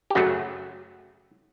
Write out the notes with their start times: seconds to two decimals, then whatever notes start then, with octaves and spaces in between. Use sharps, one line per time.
0.10 G4
0.15 F#2 C#3 F#3 A3 F#4